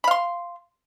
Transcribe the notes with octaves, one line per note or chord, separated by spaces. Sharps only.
F5 B5 C6